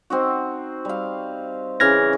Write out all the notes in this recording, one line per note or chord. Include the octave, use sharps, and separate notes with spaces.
C4 D#4 F#4
G3 F5
C#3 E3 F6 G#6 A#6